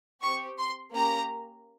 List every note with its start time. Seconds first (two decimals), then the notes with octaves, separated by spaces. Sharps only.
0.22 C4 G4 C#6
0.58 C6
0.94 A#3 C#4 G4 A#5